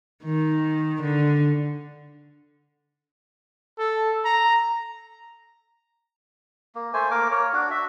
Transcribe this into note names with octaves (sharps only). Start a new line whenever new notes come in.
D#3
D3
A4
A#5
A#3
A3 C5 G#5
A#3 A#4 D6
C#5
D4 F#4
F#4 E5